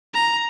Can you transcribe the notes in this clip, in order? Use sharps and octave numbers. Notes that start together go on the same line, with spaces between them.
A#5